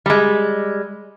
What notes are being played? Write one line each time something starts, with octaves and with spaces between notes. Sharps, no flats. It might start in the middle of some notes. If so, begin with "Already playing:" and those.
G3 G#3